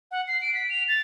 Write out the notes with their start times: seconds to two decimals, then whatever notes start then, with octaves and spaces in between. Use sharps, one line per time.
0.11 F#5
0.28 C7
0.42 D7
0.54 B6
0.70 F7
0.88 A6